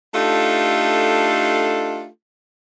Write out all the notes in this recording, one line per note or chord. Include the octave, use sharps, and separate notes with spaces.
A3 D4 D#4 F4 G4 A4